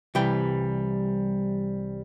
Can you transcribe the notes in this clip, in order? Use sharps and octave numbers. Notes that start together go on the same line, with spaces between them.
C2 E3 G3 G5